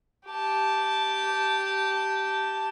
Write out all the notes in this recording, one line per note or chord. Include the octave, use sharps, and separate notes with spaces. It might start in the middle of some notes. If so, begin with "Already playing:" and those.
G4 A5